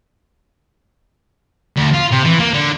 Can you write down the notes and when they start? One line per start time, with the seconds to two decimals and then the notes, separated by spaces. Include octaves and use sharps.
1.76 D2
1.94 F4
2.11 C3
2.24 E3
2.39 A#3
2.53 D3